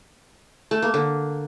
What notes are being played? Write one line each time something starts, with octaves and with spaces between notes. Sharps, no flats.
A3
A#3
D3